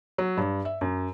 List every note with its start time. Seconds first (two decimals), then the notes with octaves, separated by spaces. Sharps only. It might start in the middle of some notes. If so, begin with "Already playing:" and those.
0.18 F#3
0.37 G2
0.65 E5
0.81 F#2